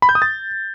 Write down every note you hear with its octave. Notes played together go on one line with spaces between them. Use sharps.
B5
G6
D#6
A6